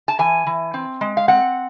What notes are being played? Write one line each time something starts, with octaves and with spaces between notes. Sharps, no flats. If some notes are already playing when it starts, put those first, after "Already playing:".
A5
E3 G#5
E3
C4
G#3
F5
C4 F#5